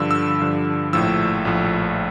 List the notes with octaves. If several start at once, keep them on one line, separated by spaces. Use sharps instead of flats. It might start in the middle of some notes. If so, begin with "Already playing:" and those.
Already playing: G2 D3 F3 E6
E6
G2 D3 F3
A#1 A2 F3 E6
A#1 A2 F3